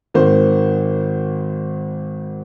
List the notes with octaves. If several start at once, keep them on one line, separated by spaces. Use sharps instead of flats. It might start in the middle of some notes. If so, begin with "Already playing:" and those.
G#1 D#3 C5